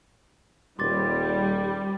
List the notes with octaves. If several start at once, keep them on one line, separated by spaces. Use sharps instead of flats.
D#1 G3 C6 D6 A6